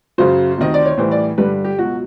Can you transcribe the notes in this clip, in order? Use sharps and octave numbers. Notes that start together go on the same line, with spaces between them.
F#2 C#3 F#3 C5
D2 C3 D#3 D#5
D5
C#5
A2 E3 G3 C5
D5
G2 D3 G3 B4
G4
C#2 B2 F#3 F#4